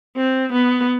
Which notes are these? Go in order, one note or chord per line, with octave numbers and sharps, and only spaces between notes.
C4
B3